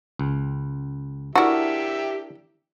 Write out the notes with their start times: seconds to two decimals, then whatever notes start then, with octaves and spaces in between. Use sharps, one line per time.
0.19 C#2
1.36 D4 E4 F#4 G4 A4 A#4 E5